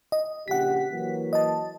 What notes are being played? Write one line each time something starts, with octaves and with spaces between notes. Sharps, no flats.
D#5
A#1 C#3 G4 F#5 B6
E3 F#3 A#3
D#5 A5